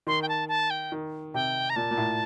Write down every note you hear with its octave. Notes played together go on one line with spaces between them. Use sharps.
D#3 C6
G5
A5
A5
G5
D#3
C3 G5
A#5
A#2 A5
A#2
A2